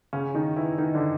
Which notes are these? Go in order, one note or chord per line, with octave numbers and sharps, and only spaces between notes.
C#3 C#4
D#3 D#4
E3 E4
D#3 D#4
D3 D4